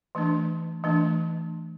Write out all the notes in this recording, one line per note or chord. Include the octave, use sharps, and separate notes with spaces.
E3 A3 D4
E3 A3 D4